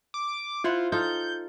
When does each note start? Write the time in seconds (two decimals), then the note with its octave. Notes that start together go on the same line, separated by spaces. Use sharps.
0.14 D6
0.64 E4 F4 C5 F#5
0.92 D#4 F4 A4 G6